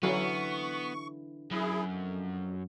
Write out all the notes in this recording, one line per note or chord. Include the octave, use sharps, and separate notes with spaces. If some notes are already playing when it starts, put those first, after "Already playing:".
D3 E3 F#3 B3 F5 C#6
F#2 E4 G#4
F2